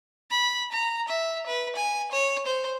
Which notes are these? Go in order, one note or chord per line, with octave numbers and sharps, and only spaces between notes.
B5
A#5
E5
B4
G#5
C#5
C5